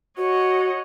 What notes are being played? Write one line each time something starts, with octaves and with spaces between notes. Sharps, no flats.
F#4 C#5 D#5 F#5